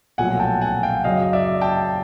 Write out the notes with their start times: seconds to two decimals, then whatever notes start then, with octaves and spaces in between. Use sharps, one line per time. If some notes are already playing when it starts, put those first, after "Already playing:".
0.18 B1 A#2 F3 A3 F#5 G#5
0.40 G5 A5
0.61 F#5 G#5
0.83 F5 G5
1.04 F#2 C#3 F#3 D#5 F5
1.33 D5 E5
1.61 G5 A5